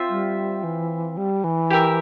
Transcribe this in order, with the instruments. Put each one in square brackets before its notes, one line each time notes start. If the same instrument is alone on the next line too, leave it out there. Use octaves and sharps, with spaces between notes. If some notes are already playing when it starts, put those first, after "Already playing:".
Already playing: [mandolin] C4 F4 C5 E5
[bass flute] G3
E3
G3
E3
[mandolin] G4 A#4 E5